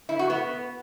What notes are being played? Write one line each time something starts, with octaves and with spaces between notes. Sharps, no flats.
E4
F#4
B3